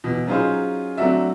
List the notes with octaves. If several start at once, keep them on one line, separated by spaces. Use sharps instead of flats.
B2 E3
F#3 C#4 D#4 F4 G#4 C5
F#3 A3 C4 D4 F#4 E5